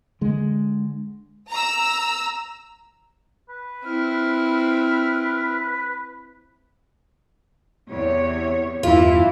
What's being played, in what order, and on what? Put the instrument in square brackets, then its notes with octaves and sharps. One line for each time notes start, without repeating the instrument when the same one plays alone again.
[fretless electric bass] D3 G#3
[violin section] A#5 E6
[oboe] B4
[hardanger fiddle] C4 E4 [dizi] F6
[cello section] E2 C3 C#5
[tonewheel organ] E2 G2 [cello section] E3 E4 [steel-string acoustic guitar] F4